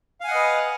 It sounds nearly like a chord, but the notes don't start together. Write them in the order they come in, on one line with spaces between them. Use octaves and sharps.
F5 G#5 F#5 D#5 B4